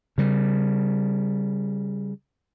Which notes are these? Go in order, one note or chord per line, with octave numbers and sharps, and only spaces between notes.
C#3 G3